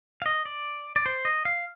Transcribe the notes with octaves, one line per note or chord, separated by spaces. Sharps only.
F5
D#5
D5
D5
C5
D#5
F5